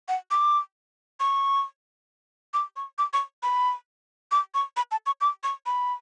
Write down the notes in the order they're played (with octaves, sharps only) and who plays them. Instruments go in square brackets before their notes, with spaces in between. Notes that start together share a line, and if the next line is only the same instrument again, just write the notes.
[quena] F#5
D6
C#6
D6
C#6
D6
C#6
B5
D6
C#6
B5
A5
C#6
D6
C#6
B5